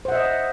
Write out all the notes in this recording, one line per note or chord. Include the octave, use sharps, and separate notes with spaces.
C5 D#5 E5 F#5